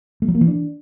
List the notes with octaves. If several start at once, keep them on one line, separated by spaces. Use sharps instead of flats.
A3
F#3
A#3
E3
D4